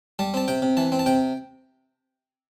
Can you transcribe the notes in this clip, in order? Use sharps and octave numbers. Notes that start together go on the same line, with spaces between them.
G3 A5
C4 A5
C3 G5
C3
E3 A5
C4
A5
C3 G5